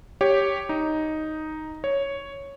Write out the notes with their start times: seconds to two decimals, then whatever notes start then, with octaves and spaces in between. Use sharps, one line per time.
0.21 G4 C#5
0.69 D#4
1.84 C#5